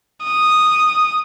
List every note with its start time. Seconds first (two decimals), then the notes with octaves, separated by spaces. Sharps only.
0.24 D#6